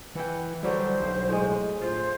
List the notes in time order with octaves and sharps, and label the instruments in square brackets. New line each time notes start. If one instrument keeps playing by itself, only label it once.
[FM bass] E3 [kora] F#5 G5
[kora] D3 F#3 E4 [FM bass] G3 [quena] C5
[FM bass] B1
[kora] A2 G#3
[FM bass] D1 [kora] F4 [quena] C5